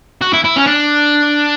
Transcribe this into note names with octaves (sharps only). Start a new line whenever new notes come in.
F#4
E4
E4
C#4
D4